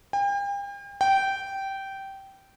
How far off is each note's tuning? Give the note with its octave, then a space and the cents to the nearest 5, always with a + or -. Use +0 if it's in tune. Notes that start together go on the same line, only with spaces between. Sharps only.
G5 +40
G5 -15